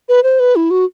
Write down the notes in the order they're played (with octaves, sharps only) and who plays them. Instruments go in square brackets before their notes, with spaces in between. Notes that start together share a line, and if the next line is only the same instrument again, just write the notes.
[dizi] B4
C5
B4
E4
F#4